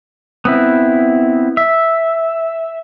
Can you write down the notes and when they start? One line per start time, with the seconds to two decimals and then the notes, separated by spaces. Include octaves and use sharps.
0.45 B3 C4 E4
1.57 E5